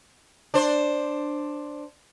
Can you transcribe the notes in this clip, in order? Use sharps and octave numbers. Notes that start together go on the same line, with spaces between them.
D4 C5